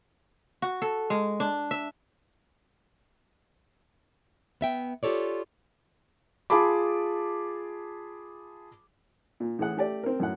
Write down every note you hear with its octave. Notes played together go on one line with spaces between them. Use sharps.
F#4
A4
G#3
D4
E5
B3 E5 G5
F4 G4 A4 C#5 D5
F4 G#4 A5 B5 D6
A#2
A2 E3 G#4 F#5
A3 G4 D5
C4 A#4
F#2 A2 F#5